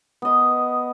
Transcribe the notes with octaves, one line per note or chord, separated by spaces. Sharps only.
B3 D#5